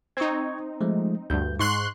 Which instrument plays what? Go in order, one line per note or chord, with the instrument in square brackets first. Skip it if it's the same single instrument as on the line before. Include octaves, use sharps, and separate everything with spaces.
[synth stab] C4 D#4 [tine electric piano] C#6 G#6
[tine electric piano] F3 G#3 A3
[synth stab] D2 G2 [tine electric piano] G6
[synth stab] G#2 C6 F#6 [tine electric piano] C#6